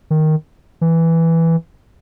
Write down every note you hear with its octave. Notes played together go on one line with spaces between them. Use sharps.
D#3
E3